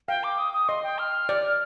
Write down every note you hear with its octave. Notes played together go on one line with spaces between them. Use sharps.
F5 G5
D6
D#6
D#6
D#5 C6
G5
F6
D5